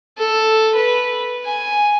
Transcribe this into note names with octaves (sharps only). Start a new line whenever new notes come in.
A4
B4
G#5